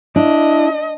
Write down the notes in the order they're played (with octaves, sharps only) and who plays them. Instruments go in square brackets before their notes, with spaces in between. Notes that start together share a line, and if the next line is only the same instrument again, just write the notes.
[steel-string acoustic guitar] D4 [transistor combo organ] E4 [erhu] D#5